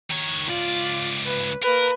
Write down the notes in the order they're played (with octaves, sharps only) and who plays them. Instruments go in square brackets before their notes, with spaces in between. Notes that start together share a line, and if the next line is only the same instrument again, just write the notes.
[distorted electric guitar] D#3 C#5
[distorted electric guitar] C#2 D5 [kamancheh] F4
[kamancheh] B4
[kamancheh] A#3 B4 [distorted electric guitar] A#4